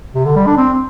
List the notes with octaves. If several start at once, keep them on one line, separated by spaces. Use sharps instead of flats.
C3
D3
G3
D4
C4